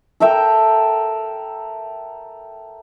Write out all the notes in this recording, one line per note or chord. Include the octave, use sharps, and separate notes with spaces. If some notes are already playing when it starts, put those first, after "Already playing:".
A4 A#4 E5 G5